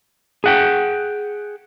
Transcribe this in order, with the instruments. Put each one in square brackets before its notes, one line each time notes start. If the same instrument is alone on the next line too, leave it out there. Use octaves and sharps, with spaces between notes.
[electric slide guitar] G#4 F#5 G5